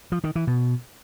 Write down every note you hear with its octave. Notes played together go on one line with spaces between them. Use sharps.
F3
D#3
E3
B2